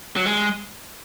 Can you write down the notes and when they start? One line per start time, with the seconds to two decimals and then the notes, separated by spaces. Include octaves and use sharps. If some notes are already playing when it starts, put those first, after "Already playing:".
0.16 F#3
0.26 G#3